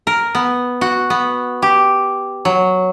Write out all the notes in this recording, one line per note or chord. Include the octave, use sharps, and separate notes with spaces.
A#4
B3
F#4
B3
G4
F#3